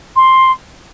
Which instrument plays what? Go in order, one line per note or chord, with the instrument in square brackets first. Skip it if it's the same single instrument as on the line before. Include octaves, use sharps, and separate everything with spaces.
[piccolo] C6